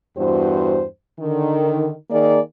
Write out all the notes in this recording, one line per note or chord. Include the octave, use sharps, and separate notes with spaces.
E2 G2 F#4 C5
D3 D#3
D#3 A#3 G#4 D5